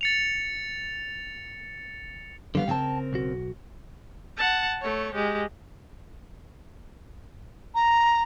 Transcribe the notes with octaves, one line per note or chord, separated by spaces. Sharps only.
A6 C#7 F7
D3 D#3 G3 B3 F5
C#3 C4 A#4 G5 A5
B1 F#4
F#5 A5
A3 C#5
G#3 G4
A#5